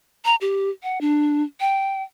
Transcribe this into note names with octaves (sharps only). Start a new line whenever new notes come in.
A#5
G4
F#5
D4
G5